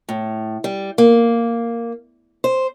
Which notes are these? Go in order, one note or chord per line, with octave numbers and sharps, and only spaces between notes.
A2
G3
A#3
C5